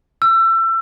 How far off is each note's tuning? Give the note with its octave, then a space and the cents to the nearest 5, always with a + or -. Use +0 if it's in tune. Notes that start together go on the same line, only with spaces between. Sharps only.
E6 +30